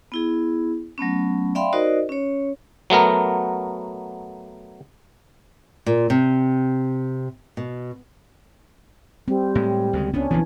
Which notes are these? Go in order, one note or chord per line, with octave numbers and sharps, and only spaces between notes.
B3 E4 G#4
F#3 A3 B3 C#4
D5 E5 F5 G5 B5 C6
D#4 F#4 A#4 C5 D5 D#5
C#4 C#5
F#3 A3 B3 A#4
A#2
C3
B2
G3 C4
A2 G#3
D2 C#3 G#3
C#2 B3 C#4 D4
B1 E3 F3 B3